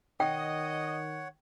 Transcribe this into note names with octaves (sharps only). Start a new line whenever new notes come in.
D#3 C#5 D#5 F#5 G5